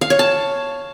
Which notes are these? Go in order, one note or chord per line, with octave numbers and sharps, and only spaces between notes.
F5
C#5
A5